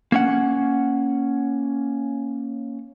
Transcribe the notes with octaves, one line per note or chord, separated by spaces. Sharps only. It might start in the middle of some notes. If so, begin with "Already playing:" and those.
A#3 C#4 F#5